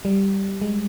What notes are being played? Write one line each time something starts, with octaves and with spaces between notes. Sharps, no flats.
G3
G#3